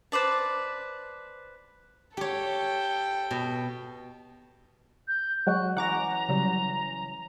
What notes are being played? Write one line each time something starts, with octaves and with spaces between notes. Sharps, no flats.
B4 C5 D5 A5
G4 A4 C#5 G5
B2
G6
F#3 G#3 F#4 F#6
E3 C#4 F#5 A#5 D6 A#6
C#3 F#3 G3